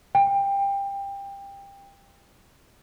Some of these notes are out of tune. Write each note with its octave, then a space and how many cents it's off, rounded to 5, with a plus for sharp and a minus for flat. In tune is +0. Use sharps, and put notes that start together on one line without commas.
G5 +20